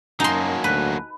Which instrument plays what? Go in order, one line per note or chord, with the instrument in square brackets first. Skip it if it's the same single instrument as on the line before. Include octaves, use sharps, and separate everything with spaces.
[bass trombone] F#2 [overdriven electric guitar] F#3 A#3 [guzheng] D#4 C6 [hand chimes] F#4 G#5 A5
[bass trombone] D2 [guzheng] B4